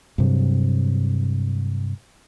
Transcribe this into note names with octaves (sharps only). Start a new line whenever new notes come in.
G2 C3 F#3